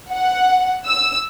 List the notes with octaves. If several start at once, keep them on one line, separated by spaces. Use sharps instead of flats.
F#5
E6